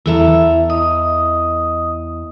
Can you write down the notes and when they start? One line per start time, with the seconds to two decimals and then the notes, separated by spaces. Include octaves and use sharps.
0.06 E2 E4 A4 E5 A#5
0.70 D#5 D#6